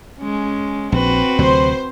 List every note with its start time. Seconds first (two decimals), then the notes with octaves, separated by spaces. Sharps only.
0.19 G#3 C#4
0.92 A#1 C4 F#4 B4
1.39 D2 C3 F#3 C5